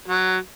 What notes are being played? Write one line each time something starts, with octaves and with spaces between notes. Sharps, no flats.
F#3